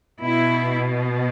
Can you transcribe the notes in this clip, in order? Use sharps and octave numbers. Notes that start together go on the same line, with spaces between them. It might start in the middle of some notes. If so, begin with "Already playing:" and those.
B2 E4